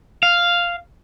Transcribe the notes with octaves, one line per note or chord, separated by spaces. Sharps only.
F5